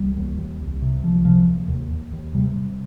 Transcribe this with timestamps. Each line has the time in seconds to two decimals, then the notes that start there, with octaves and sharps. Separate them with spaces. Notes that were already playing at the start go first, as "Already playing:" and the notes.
Already playing: C2 G3
0.16 D#2
0.38 D#2
0.60 C2
0.82 C3
1.03 C2 F3
1.25 C3 F3
1.48 D#2
1.69 D#2
1.91 D#2
2.13 D#2
2.35 C3 G3
2.56 C3